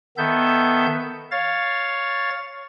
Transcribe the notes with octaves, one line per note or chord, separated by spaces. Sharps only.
D#3 B3 A4 E5 G6
C#5 F5 A6